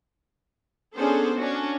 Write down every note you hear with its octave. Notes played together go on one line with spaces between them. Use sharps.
B3 C#4 D4 G#4 A4 C5
C#4 D4 F#4